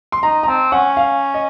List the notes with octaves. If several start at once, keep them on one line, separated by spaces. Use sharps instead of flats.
C6
D#4 A#5
A#5
C4 A5
C#4 F#5
F5
D#5